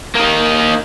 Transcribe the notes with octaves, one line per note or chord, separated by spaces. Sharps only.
A#3 D#4